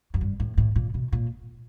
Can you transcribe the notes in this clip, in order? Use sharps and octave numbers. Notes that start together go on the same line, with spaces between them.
F#2
G2
A2
A2
A#2
B2
A#2